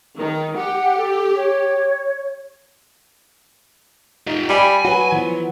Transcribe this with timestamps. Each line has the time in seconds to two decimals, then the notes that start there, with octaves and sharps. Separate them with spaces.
0.16 D#3
0.55 G4 F#5
0.97 A4
1.35 C#5
4.27 D#4 F4 G4
4.50 G3 G#5 B5
4.85 F#3 F#4 B4
5.12 E3 F3 B3